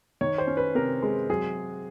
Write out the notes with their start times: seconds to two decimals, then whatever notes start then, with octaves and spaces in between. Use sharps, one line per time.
0.21 D#3 C#5
0.38 C5
0.47 C#4
0.57 B4
0.75 C3 A#4
1.03 G#3
1.29 F#3 G#4